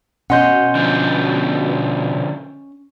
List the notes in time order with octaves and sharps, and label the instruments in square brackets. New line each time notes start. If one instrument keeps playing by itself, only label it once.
[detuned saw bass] B2 [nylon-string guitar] C#4 D#5 [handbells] F#5 C6 G6
[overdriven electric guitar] D3 F3 [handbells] G6